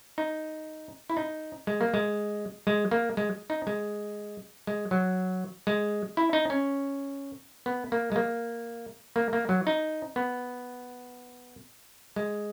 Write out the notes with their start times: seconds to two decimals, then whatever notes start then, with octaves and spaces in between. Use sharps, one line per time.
0.18 D#4
1.10 E4
1.17 D#4
1.67 G#3
1.81 A#3
1.94 G#3
2.67 G#3
2.91 A#3
3.17 G#3
3.50 D#4
3.67 G#3
4.67 G#3
4.91 F#3
5.67 G#3
6.17 E4
6.33 D#4
6.50 C#4
7.66 B3
7.92 A#3
8.12 G#3
8.16 A#3
9.16 A#3
9.33 A#3
9.49 F#3
9.67 D#4
10.16 B3
12.16 G#3